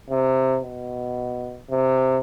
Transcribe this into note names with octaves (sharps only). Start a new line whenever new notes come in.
C3
B2
C3